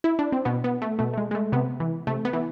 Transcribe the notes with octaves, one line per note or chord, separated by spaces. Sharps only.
E4
D4
C4
B2 B3
B3
A3
B2 A3
A3
G#3
G#3
A3
C3 B3
E3
C3 A3
B3
E3